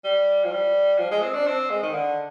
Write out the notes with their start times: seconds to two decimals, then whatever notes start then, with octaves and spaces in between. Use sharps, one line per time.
0.04 G3
0.44 F3
0.51 G3
0.98 F3
1.11 G#3
1.22 C4
1.34 D4
1.46 C4
1.70 G#3
1.83 D#3
1.94 D3